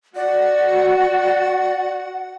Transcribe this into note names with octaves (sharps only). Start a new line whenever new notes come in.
F#4 D5 F#5